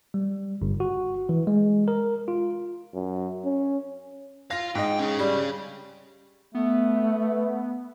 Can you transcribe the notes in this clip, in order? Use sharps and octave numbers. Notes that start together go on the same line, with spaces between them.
G3
G1
F#4
E3
G#3
A#4
F4
F#2
C#4
F4 F5 A#6
G#2 D#5 G5
C#4 G#4
G3
A3 B3